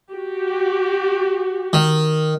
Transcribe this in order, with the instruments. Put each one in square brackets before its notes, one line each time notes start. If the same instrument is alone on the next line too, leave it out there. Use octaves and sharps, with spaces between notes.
[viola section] F#4 G4
[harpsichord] D#3